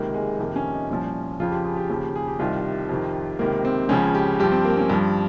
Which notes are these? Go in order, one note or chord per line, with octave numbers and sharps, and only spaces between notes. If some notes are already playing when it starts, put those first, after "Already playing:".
Already playing: C#2 C3 D#3 A#3
G#3
F2 C3 D#3 A#3
C#4
D#4
C2 A#2 F3 C#4
F2 C#3 F3 F4
G4
G#4
G4
D#2 C#3 F3
G#4
G4
C2 C3 D#3 F4
F2 C3 D#3
C#2 C3 D#3 A#3
C4
C#2 C#3 F3 C#4
G4
G2 F3 G4
C4
A#3
C#4
G2 F3